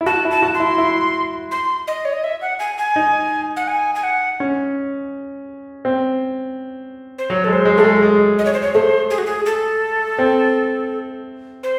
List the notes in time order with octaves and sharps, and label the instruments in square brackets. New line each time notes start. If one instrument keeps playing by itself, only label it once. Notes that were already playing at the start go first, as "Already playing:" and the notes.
[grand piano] E4
[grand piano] F#4 [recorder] A5
[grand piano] E4
[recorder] A5
[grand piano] F#4
[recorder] C6
[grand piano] E4
E4
[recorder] C6
D#5
C#5
D#5
E5
F#5
G#5
G#5
[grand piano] D#4
[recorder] F#5
G#5
G#5
F#5
[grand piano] C#4
C4
[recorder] C5
[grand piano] F#3 [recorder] C#5
[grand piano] G#3 [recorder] A4
[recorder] C5
[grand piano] G#3
[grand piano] A3 [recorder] A4
[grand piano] G#3
G#3
[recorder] D#5
C#5
C5
C#5
[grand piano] A3 [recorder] C5
[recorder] G#4
F#4
G#4
A4
[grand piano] C4
[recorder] C5